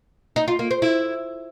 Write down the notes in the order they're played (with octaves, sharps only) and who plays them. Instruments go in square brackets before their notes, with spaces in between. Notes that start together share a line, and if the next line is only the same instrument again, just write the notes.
[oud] D#4
F4
A#3
C5
E4